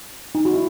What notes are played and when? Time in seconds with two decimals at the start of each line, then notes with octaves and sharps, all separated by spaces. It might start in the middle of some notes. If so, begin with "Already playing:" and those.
0.35 D#4
0.45 F#4
0.54 E4